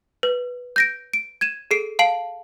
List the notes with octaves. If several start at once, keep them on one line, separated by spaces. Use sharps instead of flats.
B4
G6 A#6 D7
D7
G#6 D#7 E7
G#4 A4 C7 D7
F5 A5 C7 D7 F#7